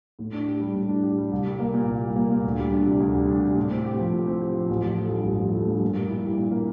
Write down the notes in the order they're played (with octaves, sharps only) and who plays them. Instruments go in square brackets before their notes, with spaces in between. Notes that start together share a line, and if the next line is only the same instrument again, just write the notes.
[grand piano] A2
D4
G4
G3
A2
D4
G4
G3
C2
G3
A#3
A#2
C2
G3
A#3
A#2
D2
G3
D4
C3
D2
G3
D4
C3
A2
C4
G4
F3
A2
C4
G4
F3
A1
F3
A3
G2
A1
F3
A3
G2
A#2
A#3
E4
G3
A#2
A#3